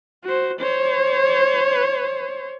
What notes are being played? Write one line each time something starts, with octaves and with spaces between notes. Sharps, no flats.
F#4 C5
C5 C#5